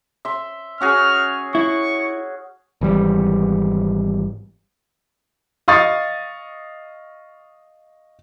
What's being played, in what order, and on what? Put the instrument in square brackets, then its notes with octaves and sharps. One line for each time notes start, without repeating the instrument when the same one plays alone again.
[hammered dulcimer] E5 C6
[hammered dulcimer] C#4 F#4 G#4 [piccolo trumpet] F6
[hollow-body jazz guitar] E4 [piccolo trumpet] C#6
[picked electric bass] G#1 E3 G3
[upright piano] D#5 F5 C#6 D#6 A6